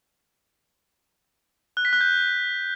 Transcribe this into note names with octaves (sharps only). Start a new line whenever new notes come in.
F#6
B6
F#6
G6